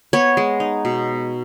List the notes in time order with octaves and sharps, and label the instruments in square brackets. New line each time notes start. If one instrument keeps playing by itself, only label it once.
[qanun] B3 C#5
G#3
D#4
B2